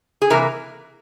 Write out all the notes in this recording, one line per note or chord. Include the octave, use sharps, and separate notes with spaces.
G#4
C3 E3 A#3 A#4